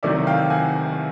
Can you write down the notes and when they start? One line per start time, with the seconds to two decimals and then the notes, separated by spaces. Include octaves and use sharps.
0.03 C2 C3 D#3 F#3 A3 D5 E5
0.27 F5 G5
0.50 F#5 G#5